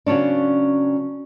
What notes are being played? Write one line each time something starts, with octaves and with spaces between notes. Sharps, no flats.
C#3 F#3 B3 C#4 D4